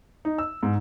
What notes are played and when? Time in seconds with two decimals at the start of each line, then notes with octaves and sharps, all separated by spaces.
0.25 D#4
0.38 E6
0.63 G#2